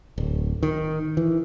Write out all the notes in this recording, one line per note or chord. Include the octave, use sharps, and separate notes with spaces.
D1
D#3
E3